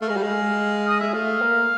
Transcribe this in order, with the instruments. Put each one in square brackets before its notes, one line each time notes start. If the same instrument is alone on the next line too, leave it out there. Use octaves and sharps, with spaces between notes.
[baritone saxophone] A3 [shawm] F5
[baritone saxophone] G#3
G3
G#3
[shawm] D#5
[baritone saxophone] G#3 [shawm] E5
[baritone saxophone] A3 [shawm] F5
[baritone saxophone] A#3